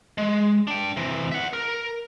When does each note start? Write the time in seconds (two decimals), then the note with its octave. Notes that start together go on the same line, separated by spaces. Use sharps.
0.18 G#3
0.67 D4 G5
0.97 C3 E3
1.32 E5 F#5
1.53 A#4